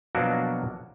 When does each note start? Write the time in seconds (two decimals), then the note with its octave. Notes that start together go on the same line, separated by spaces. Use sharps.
0.15 B2 F3 F#3 A#3 D4 F#4